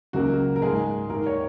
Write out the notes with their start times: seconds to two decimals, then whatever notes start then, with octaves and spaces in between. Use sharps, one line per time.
0.13 C#2 C#3 F#3 A#3 F#4
0.56 A#4
0.62 G#2 G#3 G#4
1.09 D#2 D#3 A#3 A#4
1.26 C#5